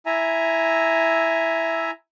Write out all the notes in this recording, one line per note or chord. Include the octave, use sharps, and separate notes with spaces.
E4 E5 G#5 A#5